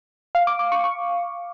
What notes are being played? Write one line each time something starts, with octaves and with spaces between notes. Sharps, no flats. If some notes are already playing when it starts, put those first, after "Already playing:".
F5
D6
D6
C#6
C#6